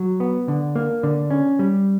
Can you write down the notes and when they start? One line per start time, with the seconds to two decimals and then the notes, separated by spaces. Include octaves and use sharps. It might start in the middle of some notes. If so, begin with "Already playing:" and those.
Already playing: F#3
0.20 B3
0.48 D3
0.76 A#3
1.03 D3
1.30 C#4
1.59 G3